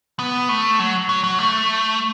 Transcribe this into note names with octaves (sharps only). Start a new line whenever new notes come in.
B3
A3
F#3
F#3
F#3
A3